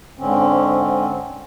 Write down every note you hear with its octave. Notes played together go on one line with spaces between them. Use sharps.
G#2 D3 C4 C#4